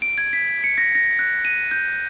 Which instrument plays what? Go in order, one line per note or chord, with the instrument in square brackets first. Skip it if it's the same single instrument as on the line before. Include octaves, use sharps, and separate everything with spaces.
[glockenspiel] D7
G#6
B6
C#7
A#6
A#6
F#6
D#7
G6